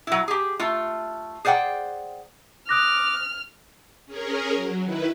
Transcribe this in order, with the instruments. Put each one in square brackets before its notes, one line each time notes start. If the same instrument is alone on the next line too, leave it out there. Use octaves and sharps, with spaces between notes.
[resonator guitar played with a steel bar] F#3 E4
G4 G#4
A3 F4
G#4 C5 D5 F#5 G5
[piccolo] D6 [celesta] D#6 F#6 A#6 [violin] F6
[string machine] C#4 G#4 A#4
F#3
D#3 E4 B4